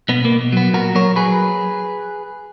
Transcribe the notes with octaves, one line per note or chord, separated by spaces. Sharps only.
B2 B3
A#3
B2
F#3 B3
A#2 F#4 A#4
F#3 A#4 C#5
F#3 G#4 B4